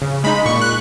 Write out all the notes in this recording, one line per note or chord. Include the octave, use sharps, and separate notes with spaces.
C#3
G#3 D#4 B5
A#2 C#6
F#6